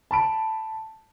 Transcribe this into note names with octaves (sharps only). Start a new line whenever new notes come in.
A5 B5 D7